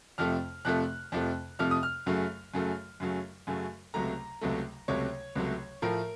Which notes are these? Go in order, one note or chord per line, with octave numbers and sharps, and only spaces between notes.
F2 C3 F3 A3 F6
F2 C3 F3 A3 F#6
F2 C3 F3 A3
F2 C3 F3 A3 F6
D#6
F6
F#2 C#3 F#3 A3
F#2 C#3 F#3 A3
F#2 C#3 F#3 A3
F#2 C#3 F#3 A3
C#2 C3 F#3 A3 A#5
C#2 C3 F#3 A3
C#2 C3 F#3 A3 C#5
C#2 C3 F#3 A3
A2 F3 A3 A#4